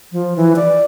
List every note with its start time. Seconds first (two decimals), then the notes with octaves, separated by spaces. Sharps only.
0.12 F3
0.36 E3
0.56 D5